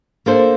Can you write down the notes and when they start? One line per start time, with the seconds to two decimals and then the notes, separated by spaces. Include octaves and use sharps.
0.26 A#3 D4 A4 C5